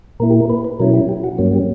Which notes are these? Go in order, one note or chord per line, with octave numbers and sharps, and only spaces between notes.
A#2 A#3 E4 A#4
G4
A#4
B4
B4
B2 F#3 C#4 E4 A#4
G4
G4
F#4
G2 F#3 A#3 C#4
G4